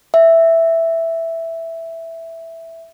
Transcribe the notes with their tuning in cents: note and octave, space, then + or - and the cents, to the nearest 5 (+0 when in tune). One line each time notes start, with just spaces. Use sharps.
E5 +0